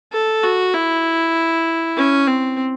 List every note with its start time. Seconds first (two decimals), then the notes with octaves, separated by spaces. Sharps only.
0.13 A4
0.43 F#4
0.74 E4
1.97 C#4
2.27 C4